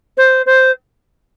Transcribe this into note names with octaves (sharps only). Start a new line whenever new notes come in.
C5
C5